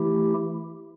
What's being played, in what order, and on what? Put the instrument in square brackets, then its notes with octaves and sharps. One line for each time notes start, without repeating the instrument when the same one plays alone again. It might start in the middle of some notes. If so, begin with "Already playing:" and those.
Already playing: [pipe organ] E3 A3 E4 G4